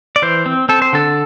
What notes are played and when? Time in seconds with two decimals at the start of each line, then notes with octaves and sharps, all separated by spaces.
0.16 D5
0.22 E3 C5
0.46 C4
0.69 C4 A4
0.82 C5
0.93 D3 A4